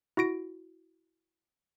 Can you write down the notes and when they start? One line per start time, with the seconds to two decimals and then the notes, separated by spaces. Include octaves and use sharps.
0.17 E4 F#4 A#6 D7